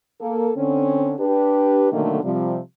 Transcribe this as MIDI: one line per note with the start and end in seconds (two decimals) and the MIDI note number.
0.21 0.51 58
0.21 0.51 69
0.57 1.14 50
0.57 1.14 60
0.57 1.14 61
1.20 1.89 62
1.20 1.89 67
1.20 1.89 71
1.92 2.23 47
1.92 2.23 50
1.92 2.23 51
1.92 2.23 54
1.92 2.23 57
1.92 2.23 58
2.23 2.58 48
2.23 2.58 53
2.23 2.58 55